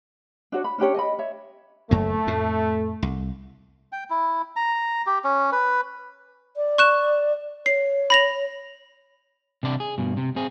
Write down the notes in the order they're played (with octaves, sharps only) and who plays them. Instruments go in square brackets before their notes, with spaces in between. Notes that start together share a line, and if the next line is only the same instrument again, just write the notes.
[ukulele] D4 F#4 C#5
B5
C#4 D4 G4 C#5
D#5 G#5 B5
C#5 E5
[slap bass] F#1 F#2 A#3 [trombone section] A3
[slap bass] F2 A2
C2
[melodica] G5
E4
A#5
G4
C#4
B4
[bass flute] D5
[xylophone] C#6 F#6 E7
[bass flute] C#5 [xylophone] C7
[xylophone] B5 A#6 F7
[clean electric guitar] C3 D4 D5
G#4
G2 B2
C3
C4 G#4